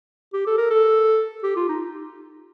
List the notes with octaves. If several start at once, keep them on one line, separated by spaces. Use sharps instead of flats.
G4
A4
A#4
A4
G4
F4
D#4